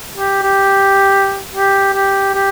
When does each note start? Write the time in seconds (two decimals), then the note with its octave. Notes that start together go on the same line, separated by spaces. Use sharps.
0.14 G4
0.43 G4
1.53 G4
1.94 G4
2.35 G4